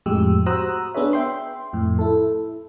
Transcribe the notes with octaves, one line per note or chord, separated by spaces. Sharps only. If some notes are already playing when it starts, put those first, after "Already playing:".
F2 A2 G#3 G4 E6
F#4 C5 A#5 D#6 E6 F#6
B3 D4 G#4 B4 C#5 E5
E5 G5 C6
F2 A2
E4 A4